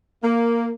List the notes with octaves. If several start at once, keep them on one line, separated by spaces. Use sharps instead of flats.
A#3